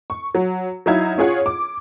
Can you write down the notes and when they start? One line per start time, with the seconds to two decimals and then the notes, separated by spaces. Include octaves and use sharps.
0.10 C#6
0.35 F#3
0.86 F#3 D#4 E4 F5 G#6
1.18 C#4 F4 G#4 C#5 F#5
1.46 D6